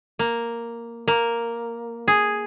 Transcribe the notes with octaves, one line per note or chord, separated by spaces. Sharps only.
A#3
A#3
G#4